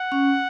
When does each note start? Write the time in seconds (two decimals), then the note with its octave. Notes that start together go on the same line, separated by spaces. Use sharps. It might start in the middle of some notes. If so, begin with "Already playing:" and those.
Already playing: F#5
0.12 C#4